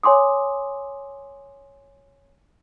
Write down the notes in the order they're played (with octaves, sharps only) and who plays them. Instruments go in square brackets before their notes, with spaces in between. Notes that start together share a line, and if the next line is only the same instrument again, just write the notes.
[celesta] C#5 G#5 C6 D6 D#6